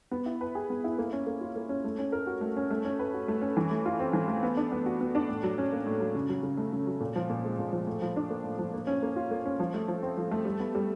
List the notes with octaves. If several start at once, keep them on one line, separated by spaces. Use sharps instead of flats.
B3
E4
B4
G#4
B3
E4
A#3
C#4
A#3
F4
A#3
C#4
A3
C#4
A#4
F#4
A3
C#4
A3
C#4
B4
F#4
A3
C#4
E3
A3
F4
C4
E3
A3
B3
D4
B3
F#4
B3
D4
A2
F#3
C#4
A#3
A2
F#3
C#3
F#3
C#3
A3
C#3
F#3
A#2
F3
A#2
G#3
A#2
F3
A2
F3
D4
A#3
A2
F3
A#3
C#4
A#3
F4
A#3
C#4
F3
A3
F3
C4
F3
A3
G3
B3
G3